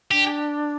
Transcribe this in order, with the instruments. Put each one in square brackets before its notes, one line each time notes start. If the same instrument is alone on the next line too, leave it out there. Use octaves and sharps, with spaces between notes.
[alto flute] D4 [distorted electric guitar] G4